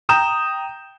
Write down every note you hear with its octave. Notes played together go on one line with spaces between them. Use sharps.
G5 A#5 D#6 G6 E7